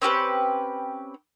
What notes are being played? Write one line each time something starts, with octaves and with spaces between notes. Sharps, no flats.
C4 C#4 G4 B4